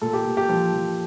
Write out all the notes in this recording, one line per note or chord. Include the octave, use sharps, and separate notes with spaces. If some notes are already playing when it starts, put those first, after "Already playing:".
A#2 A4
G4
A#2
G4
F3
F3